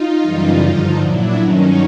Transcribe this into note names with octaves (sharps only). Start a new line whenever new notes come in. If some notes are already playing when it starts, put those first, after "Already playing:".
Already playing: D#4 F4
F#2 C#3 E3 G3
G2 D3 F3 D#4 F4
A#2 F#3 D4 E4
G2 D#3 F#3 C#4 D#4